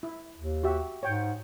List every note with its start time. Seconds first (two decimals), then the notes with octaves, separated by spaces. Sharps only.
0.03 E4
0.38 D#2
0.63 F#4 G4 E5
1.03 G#2 C#5 G5